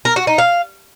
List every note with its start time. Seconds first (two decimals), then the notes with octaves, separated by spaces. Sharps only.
0.05 A#4
0.16 F#4
0.27 D#4
0.38 F5